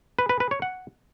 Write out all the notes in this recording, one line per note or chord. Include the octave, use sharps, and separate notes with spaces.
B4
B4
B4
C#5
F#5